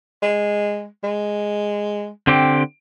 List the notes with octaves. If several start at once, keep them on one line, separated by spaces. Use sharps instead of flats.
G#3
G#3
D3 C4 G4